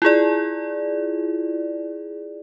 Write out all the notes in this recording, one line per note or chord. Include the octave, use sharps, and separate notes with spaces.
E4 F4 G#4 D5